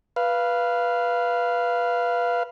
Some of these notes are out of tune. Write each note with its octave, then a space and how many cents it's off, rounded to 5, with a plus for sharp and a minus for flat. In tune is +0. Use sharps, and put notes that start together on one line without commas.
B4 -15 F5 -15